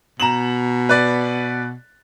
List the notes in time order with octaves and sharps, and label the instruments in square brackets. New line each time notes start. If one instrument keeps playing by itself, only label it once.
[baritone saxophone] B2 [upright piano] A#5 E7 F#7
[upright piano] B4 D5